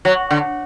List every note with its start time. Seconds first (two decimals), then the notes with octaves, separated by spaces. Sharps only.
0.05 F#3
0.31 D3